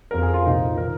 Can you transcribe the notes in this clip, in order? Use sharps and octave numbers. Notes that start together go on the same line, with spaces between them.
F2 F3 A#4
G#4
F4
C2 A#2 F3 D#4
D#3 A#4